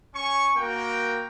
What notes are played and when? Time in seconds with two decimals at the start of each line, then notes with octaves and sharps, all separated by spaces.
0.15 C#4 G#5 C#6
0.57 A#3 F#4 A#4 G5